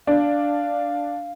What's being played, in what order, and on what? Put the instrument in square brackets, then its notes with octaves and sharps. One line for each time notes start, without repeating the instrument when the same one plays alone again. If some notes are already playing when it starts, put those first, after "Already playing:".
[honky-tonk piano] D4 [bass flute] F5